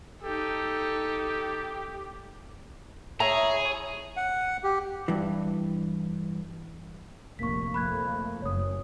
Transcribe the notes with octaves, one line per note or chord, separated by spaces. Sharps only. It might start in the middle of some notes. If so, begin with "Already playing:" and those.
D#4 G4 A4
E4 G#4 C#5 A#5
F#5
G4
G2 E3
F1 A#1 A#3 C#6 B6
F2 A3 A#3 B5 F#6 G#6
F#1 F#2 C#5 D#6